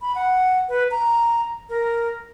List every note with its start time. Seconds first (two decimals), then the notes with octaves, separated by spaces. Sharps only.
0.01 B5
0.15 F#5
0.69 B4
0.91 A#5
1.69 A#4